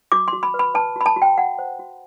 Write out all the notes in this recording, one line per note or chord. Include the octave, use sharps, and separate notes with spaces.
F#4 D6
C6
F#4
B5
B4
B5
B4 A5
F#4 B5
A5
F#4
G5
F#4 F#5
C5
F#4